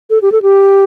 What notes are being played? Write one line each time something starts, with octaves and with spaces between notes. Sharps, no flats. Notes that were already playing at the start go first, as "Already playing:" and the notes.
A4
G4
A4
G4